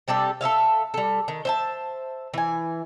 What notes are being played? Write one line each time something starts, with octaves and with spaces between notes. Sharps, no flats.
C3 G3 D4 A4
A4 C5 E5 F5
G3 A4
D#3
C5 E5 A5
E3 G#5